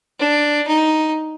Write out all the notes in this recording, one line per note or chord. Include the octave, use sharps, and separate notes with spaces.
D4
D#4